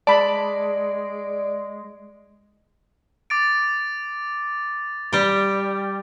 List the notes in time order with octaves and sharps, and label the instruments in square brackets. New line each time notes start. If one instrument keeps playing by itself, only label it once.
[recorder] G#3 [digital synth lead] D5 [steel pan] A5 B5
[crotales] D6 A6 D7
[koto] G3 G4